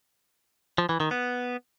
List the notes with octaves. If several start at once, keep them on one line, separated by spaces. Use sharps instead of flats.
F3
E3
D#3
B3